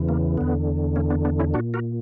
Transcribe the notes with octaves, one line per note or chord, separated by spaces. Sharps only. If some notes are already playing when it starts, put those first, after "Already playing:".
Already playing: E2 C#3 E3
A#3
E2 D3 B3
A#3 C#4
B3 D4
B3 D4
C#4 E4
A#2 D4 F#4
F#4 A#4